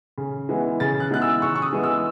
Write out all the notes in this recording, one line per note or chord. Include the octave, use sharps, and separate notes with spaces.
C#3
E3 G#3 B3
C#3 A6
F#6
E3 G#3 B3 F#6
E6
C#3 C#6
C#6
D#6
E3 G#3 B3
E6